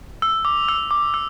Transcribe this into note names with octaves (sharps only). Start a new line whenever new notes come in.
E6
D6
E6
D6
E6